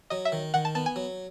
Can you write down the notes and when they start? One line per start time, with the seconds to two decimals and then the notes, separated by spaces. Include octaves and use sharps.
0.10 F#3 D#5
0.25 E5
0.32 D#3
0.54 D#3 F#5
0.65 A5
0.75 B3 A5
0.86 G#5
0.96 F#3